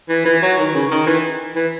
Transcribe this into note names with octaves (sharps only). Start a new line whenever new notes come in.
E3
E3
F#3
D#3
C#3
D#3
E3
E3